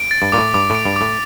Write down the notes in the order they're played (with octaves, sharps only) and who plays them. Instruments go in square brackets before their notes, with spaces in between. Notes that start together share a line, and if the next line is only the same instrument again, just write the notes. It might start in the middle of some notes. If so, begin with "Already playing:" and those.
Already playing: [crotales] D7
A6
[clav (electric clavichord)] G2
[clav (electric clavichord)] A#2 [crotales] D6
[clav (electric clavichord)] A2
[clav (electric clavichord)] G2 [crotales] D6
[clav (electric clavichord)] A2 [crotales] D7
[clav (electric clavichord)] G2
[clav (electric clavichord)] A2 [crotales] D6